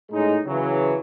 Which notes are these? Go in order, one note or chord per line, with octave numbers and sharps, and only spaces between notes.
A2 G#3 C#4 D#4
C#3 E3 F#3